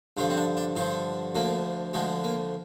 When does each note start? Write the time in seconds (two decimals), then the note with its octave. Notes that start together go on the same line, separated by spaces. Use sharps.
0.17 G2 D3 F3 F4
0.30 C4
0.37 D4
0.57 D4
0.76 G2 D3 F3 F4
1.35 D2 D3 F3 A#3
1.93 D2 D3 F3 G#3
2.24 A#3